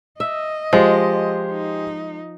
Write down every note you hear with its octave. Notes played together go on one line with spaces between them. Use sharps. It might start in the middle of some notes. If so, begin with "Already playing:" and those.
D#5 E5
F3 G#3 G4 G#4 C5
D#4